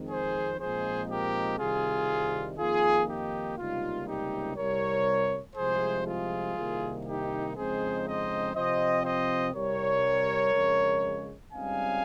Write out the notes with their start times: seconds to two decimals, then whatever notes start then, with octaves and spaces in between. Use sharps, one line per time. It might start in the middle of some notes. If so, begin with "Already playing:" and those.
Already playing: F2 D#3 G#3 C4
0.09 G#4 C5
0.59 A#2 F3 G#3 C4 D#4 G#4 C5
1.09 G4 A#4
1.59 C2 C3 D#3 G3 F4 G#4
2.58 F2 D#3 A#3 F4 G#4
3.08 D#4 G4
3.58 C#2 C3 G3 A#3 D#4 F4
4.07 D#4 G4
4.57 C2 C3 G3 A#4 C#5
5.56 C2 C3 F3 G#3 G#4 C5
6.07 F4 G#4
6.56 C2 C3 D#3 A#3
7.05 D#4 G4
7.55 F2 C#3 G#3 C4 D#4 G#4 C5
8.05 C5 D#5
8.55 C3 F3 C4 C5 D#5
9.04 C5 D#5
9.54 C2 C3 G3 A#4 C#5
10.54 F2 C#3 G#3
11.53 C#2 C#3 G3 C4 D#4 F5 G#5